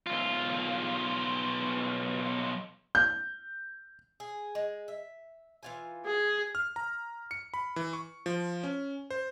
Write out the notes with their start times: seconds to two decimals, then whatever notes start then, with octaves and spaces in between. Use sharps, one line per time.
0.07 B1 F4
2.95 G6
4.20 G#4
4.55 G#3
4.88 E5
5.63 E3 F4 G#5
6.05 G#4
6.55 F6
6.76 A#5
7.31 C#7
7.54 B5
7.76 E3
7.93 C#6
8.26 F3
8.64 C#4
9.10 C5